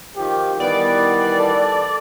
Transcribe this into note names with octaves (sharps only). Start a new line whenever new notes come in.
D#3 F3 G4
D#3 E3 G3 B3 D5
A4